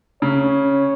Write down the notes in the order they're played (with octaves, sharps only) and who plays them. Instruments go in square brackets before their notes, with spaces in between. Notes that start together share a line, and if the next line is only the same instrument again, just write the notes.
[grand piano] C#3 [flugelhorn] C#5